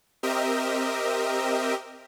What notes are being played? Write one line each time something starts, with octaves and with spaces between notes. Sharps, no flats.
C4 G4 A#4 D#5 E5